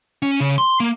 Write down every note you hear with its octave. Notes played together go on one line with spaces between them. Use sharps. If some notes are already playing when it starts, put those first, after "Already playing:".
C#4
C#3
C6
A#3